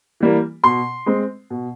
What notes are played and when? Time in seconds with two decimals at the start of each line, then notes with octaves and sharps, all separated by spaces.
0.20 E3 G3 A#3
0.64 B2 C6
1.06 G#3 C4
1.50 B2